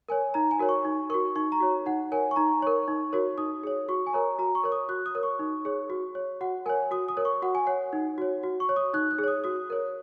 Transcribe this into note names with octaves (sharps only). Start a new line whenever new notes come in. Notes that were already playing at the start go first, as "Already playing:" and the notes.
A#4 C#5 G#5
D#4 A#5
G#5
F#4 A#4 C#5
C#6
D#4
F#4 A#4 C#6
D#4 C#6
A#5
F#4 C#5
D#4 F#5
A#4 C#5 G#5
C#6
D#4 A#5
A#4 C#5 C#6
D#4
F#4 A#4 C#5
D#4 D#6
G#4 C#5
F#4 C#6
G#5
A#4 C#5 A#5
F#4 A#5
C#6
A#4 C#5
D#6
F#4 F#6
D#6
A#4 C#5
C#6
D#4
G#4 C#5
F#4
C#5
F#4 F#5
A#4 C#5 G#5
F#4 D#6
D#6
A#4 C#5
C#6
F#4 F#5
G#5
C#5 F#5
D#4
F#4 C#5
F#4
C#6
C#5
D#6
D#4 F#6
F#6
G#4
C#5 D#6
F#4 D#6
A#4 C#5